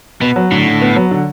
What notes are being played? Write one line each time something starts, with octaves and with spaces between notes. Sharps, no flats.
B2 B3
F#3
A2 D3
D3
B3
F#3
D3